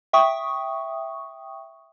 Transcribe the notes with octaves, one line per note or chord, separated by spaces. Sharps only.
E5 G5 C#6 D#6